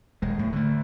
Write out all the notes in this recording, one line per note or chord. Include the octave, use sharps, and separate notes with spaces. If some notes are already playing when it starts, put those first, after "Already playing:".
D#1 G#3
A2
D3 A3